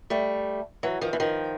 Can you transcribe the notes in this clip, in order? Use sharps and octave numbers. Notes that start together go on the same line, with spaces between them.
G3 A3
E3 F#3
D#3 F3
E3
D#3 F3